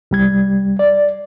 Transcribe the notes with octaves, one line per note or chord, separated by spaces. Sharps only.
C2 G3 G#6
D5